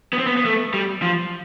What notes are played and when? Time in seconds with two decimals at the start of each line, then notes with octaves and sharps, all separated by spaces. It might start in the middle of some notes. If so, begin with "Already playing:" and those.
0.13 B3
0.18 C4
0.27 B3
0.37 B3
0.45 A3
0.74 G3
1.02 F3